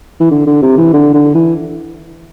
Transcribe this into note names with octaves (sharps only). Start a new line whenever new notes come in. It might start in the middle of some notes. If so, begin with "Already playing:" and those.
E3
D3
D3
C3
E3
D3
D3
E3